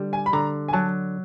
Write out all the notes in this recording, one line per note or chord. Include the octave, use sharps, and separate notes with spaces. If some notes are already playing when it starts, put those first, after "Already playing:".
Already playing: D3 G3
G#5
B5
D3 A#5
G#5
F#3 A5